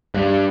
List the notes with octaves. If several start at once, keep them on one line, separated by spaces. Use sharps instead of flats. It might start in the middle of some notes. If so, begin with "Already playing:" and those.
G2